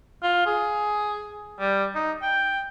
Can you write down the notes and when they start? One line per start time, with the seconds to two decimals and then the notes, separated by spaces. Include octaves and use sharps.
0.23 F4
0.46 G#4
1.60 G3
1.95 D#4
2.22 G5